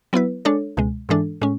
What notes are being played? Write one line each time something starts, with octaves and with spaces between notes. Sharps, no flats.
F#3 B3 E4 B4
G#3 D4 A4 C#5
C#2 B2 G#3
G#2 E3 G#3 D4 A4
A2 G#3 C#4